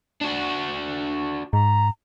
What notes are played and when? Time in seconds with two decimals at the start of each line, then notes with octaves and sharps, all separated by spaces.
0.21 D4 F#4
1.53 G#2 A#5